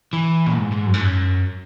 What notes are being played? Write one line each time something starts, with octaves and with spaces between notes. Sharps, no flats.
E3
A#2
G#2
G#2
F#2
G#2
F#2